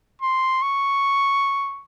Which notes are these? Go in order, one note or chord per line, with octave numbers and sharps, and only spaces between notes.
C6
C#6